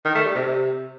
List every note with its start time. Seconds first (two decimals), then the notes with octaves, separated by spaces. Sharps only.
0.05 D#3
0.15 A3
0.25 G3
0.35 C3